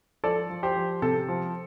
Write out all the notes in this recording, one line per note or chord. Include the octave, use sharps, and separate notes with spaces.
F3 A4 D5
F3
G4 C5
F3
C3 A4
F3